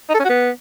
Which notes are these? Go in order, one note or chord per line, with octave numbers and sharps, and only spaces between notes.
D#4
A4
C#4
F#4
B3